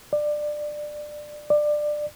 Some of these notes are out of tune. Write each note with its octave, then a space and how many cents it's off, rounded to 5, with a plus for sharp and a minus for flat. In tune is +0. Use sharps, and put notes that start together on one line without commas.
D5 +20
D5 +20